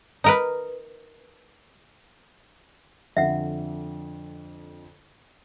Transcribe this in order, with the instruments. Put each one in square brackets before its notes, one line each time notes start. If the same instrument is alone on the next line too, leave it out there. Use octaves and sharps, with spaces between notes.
[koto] D#4 A#4 B4
[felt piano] F2 D3 [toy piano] E5 F#5